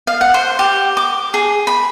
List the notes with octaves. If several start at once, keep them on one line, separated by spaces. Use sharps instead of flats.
F5
F#5
C5
G4
D6
G#4
B5